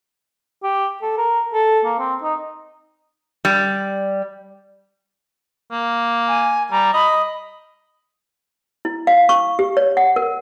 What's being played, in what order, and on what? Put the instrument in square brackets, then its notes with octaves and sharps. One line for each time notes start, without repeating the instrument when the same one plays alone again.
[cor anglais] G4
A4
A#4
A4
A#3
C4
D#4
[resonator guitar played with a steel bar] G3
[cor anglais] A#3
[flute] G#5
[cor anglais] G3 [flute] A#5
[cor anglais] D#5 [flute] B5
[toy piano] E4
F5
C#6
G4
C#5
F#5
A#4